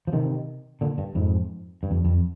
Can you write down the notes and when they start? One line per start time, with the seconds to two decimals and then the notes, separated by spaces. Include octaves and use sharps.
0.07 F3
0.13 C3 D#3
0.81 A#2 D3
0.98 G2
1.15 F2 G#2
1.83 G2
1.91 F2
2.05 F2